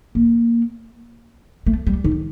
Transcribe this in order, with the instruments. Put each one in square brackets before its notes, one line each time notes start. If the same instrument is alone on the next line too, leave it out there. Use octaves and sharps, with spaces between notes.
[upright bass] A#3
A3
G3
D#3